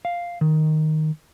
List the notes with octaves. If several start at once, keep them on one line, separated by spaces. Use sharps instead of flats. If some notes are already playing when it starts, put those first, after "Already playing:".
F5
D#3